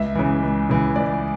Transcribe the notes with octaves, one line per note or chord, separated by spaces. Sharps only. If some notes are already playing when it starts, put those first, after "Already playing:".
Already playing: C#2 E5
C#3 E3
C#2
C#3 E3
C#2 D5